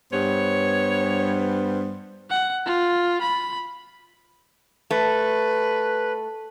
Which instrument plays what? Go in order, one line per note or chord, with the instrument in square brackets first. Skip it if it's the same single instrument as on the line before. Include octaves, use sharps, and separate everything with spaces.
[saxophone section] G2 B3 C5 [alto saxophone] C#5
[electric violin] F#5
F4
B5
[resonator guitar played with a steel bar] A3 [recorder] B4